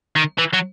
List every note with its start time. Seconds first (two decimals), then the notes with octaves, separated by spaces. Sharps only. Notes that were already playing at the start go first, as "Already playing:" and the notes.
0.16 D#3
0.38 E3
0.53 F#3